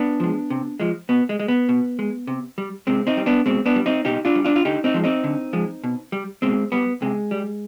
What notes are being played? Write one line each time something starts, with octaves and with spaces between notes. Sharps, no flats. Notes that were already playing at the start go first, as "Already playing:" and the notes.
Already playing: B3 D4
F3 G#3
C3
F3 G#3
B2 B3
G#3
G#3
B3
B2
G#3
C3
G3
C3 G#3 C4
C4 D#4
G3
B3 D4
B2 G#3 C4
B3 D4
G3
C4 D#4
B2 D#4 G4
D4 F4
G3
D4 F4
F4
D3 D#4 G4
C4 D#4
F3 G#3
C4 D#4
D3
F3 G#3
B2
G3
B2 G#3 C4
G3 B3
C3 G#3
G3